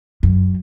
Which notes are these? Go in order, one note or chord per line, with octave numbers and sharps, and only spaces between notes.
F#2